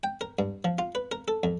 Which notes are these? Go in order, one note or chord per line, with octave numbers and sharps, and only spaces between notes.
G5
A#4
G2
F3
F4
B4
A#4
A4
F2